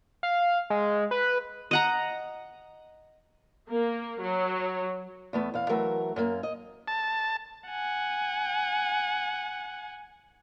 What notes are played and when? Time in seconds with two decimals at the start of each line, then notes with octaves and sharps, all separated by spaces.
0.23 F5
0.70 G#3
1.11 B4
1.71 D#5 F#5 A#5
3.70 A#3
4.21 F#3
5.33 E2 A3 B3
5.54 E2 F5
5.69 E3 F#3 A3 A#4
6.16 F#2 A#3
6.43 D#5
6.88 A5
7.69 F#5 G#5